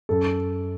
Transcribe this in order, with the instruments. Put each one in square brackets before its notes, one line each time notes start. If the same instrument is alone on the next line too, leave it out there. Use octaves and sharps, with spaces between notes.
[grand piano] F#2 A4